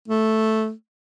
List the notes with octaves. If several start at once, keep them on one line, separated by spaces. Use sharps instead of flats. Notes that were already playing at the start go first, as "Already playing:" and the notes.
A3